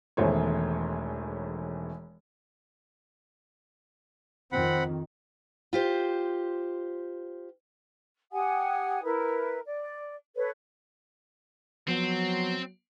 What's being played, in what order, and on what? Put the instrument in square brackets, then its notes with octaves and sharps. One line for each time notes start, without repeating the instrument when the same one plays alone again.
[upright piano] E1 E2 D#3 A3 C5 C#5
[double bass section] F2 D#3 [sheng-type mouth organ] C4 F#5 B5
[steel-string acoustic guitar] F4 G4 C5
[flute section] G4 F#5 G#5 D#6
E4 A#4 B4
D5
A4 B4 C#5
[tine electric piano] F3 B3 [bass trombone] F#3 [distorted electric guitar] C4